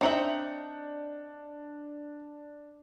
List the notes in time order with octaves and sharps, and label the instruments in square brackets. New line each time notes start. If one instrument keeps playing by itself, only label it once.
[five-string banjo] C4 D#4 E5 [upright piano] D4 C#7 F#7